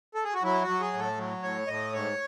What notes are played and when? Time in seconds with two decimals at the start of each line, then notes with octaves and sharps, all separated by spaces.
0.15 A4
0.25 G#4
0.34 F#4
0.43 F#3 E4
0.62 F#4
0.68 F#3
0.80 G#4
0.93 A2
0.99 A4
1.17 F#3
1.42 A2 C#5
1.67 A2 D#5
1.93 G#2 C#5